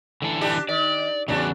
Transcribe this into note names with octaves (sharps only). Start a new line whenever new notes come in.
D3 E3 A4
D4 G4
D#3 D5
E2 G2 C#3 F#3 D4